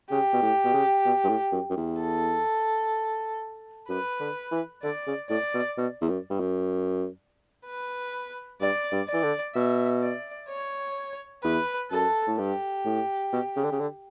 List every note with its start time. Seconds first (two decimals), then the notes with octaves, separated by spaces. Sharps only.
0.11 C#3 G4
0.33 B2
0.43 A2
0.64 B2
0.74 C#3
1.05 B2
1.24 G2
1.29 A2
1.53 F#2
1.70 F#2
1.77 E2
2.00 A4
3.88 F#2 B4
4.20 D3
4.52 E3
4.83 D3 D5
5.07 C#3
5.30 A2 D5
5.54 B2
5.78 B2
6.01 E2
6.09 F#2
6.30 G2
6.40 F#2
7.66 B4
8.61 G2 D5
8.92 G2
9.08 D5
9.14 E3
9.24 D3
9.55 B2 E5
10.03 D5
10.49 C#5
11.44 E2 B4
11.91 F#2 A4
12.27 A2
12.39 G2 G4
12.86 A2
13.33 B2
13.57 C#3
13.64 D3
13.72 C#3
13.80 D3